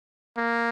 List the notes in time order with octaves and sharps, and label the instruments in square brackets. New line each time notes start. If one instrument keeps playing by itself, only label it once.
[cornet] A#3